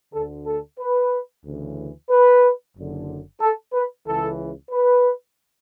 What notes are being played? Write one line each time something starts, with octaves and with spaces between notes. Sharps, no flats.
D2 D3 A4
A4
B4
D2 C#3 E3
B4
F#1 F#2 D3
A4
B4
C#2 C#3 E3 A4
B4